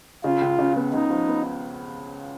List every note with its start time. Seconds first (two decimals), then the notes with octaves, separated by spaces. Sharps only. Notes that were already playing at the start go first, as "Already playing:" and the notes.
0.24 C#3 F4
0.41 C#2
0.59 C#3
0.76 B3
0.93 C#2 D#4
1.10 F3
1.28 B3